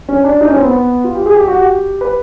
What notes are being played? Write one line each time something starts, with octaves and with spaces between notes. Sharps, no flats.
C#4
D4
D#4
C#4
C4
B3
F4
G4
G#4
G4
F#4
G4
B4